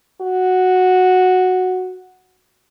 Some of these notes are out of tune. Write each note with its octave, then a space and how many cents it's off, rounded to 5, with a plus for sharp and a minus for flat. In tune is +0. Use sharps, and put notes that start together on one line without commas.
F#4 -5